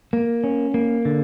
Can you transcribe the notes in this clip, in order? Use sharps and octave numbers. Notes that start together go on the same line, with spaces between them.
A#3
C#4
A#3
D3